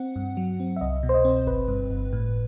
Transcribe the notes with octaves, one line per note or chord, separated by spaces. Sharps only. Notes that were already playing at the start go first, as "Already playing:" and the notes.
Already playing: C4 F#5
G2
F#3
C4
E5
C2 D#5
B2
C5
D#5
C4
G1 B4
G2
G1
A2